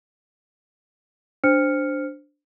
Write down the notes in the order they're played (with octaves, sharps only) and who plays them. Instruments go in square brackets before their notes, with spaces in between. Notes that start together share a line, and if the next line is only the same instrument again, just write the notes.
[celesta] D4 C5 F6 C#7